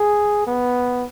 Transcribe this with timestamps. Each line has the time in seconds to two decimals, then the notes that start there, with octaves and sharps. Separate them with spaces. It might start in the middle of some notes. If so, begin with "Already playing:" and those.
Already playing: G#4
0.47 B3